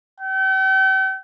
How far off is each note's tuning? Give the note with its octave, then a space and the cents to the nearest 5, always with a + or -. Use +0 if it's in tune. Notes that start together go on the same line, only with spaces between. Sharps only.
G5 -45